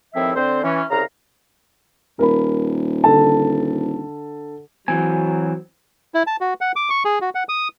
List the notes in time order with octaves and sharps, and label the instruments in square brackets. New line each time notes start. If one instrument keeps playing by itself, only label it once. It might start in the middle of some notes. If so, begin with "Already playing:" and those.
[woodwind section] D#2 A2 F3 C4 E4 E5
D3 C4 C5
E3 C#4
C2 C#3 F5 A#5
[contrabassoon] D#1 [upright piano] A#4 B5
[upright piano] D3 A4 A5
[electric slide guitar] E3 C4 [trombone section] F#3 [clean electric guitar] G#5
[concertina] E4
A5
F#4
F#5
D6
C#6
G#4
F#4
F#5
D#6